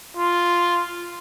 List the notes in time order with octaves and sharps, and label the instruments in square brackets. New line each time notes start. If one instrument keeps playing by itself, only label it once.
[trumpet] F4